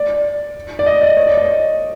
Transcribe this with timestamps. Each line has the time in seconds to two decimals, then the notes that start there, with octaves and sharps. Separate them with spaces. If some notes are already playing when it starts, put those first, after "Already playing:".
Already playing: D5
0.79 D5
0.86 D#5
1.02 D5
1.17 C#5
1.27 D5
1.37 D#5